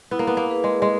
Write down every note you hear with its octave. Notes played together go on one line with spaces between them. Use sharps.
B3 E4
A#3
B3
A#3
G#4 B4
G#3
G#3